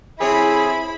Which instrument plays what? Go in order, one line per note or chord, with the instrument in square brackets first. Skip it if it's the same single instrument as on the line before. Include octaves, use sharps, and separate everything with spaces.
[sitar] F2 C4 C#5 [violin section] E4 B5 [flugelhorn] G#4